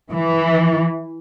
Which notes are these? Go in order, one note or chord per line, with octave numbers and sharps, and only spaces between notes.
E3